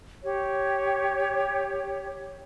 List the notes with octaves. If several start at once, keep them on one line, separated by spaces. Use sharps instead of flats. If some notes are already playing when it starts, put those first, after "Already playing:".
G4 C#5